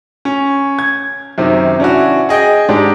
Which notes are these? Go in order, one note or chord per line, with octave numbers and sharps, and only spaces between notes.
C#4
G#6
F#2 C3 D#3
C#4 D4 E4 F#4
G#4 D#5 G5
G#2 G#3 D4 G4